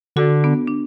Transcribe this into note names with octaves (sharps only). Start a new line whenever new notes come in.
D3 F#4 A4
B3 D4
D4